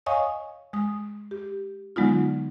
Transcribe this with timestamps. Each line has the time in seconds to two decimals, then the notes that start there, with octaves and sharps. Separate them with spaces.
0.06 C#5 D#5 F5 G#5 C#6 D#6
0.73 G#3 D#6
1.31 G4
1.96 D3 F#3 G#3 B3 D#4 F4